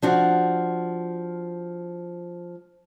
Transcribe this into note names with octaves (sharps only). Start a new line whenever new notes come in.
F3 D4 F#4